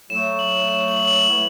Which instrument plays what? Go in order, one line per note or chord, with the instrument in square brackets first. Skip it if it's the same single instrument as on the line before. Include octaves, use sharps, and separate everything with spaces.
[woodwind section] A2 F#3 A3 [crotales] E7
[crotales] F#7
E7
F#7
F#7
[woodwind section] B3 E4 B4